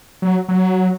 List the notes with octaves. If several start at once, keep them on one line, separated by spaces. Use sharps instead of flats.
F#3
F#3